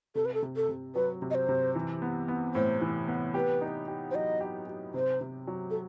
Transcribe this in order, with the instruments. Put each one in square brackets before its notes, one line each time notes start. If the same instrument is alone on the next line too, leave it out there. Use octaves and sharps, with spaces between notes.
[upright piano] C3 [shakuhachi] A4
[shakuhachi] B4
A4
[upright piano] C3
[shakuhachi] A4
[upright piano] C3
[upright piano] F#3 [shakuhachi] B4
[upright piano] C3
[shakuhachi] D#5
C5
[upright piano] C3
E3
B3
B3
[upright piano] A2 [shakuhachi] C5
[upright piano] E3
B3
[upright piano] G4 [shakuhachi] B4
[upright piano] D#4
G4
[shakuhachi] C5
[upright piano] F#3 [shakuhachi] D#5
[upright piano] G4
G4
[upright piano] C3 [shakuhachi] C5
[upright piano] C3
F#3
[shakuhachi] A4